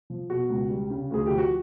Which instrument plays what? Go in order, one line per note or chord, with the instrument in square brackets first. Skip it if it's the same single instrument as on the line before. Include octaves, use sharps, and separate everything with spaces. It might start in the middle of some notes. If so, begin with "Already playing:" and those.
[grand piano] F3
B2 F#4
C#2
G3
C#3
D2 G#4
F3 G4
F#4